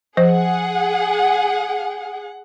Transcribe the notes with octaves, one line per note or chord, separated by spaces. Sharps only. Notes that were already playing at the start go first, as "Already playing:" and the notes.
F3 G#4 C5 F#5